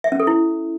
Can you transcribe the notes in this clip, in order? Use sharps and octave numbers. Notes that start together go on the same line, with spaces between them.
E5
C#4
A4
E4